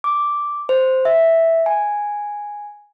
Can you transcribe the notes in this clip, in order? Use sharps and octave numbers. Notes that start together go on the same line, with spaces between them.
D6
C5
E5
G#5